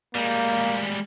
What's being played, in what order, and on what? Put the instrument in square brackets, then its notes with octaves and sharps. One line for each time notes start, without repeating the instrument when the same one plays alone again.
[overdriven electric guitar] G3 G#3 [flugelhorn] A#3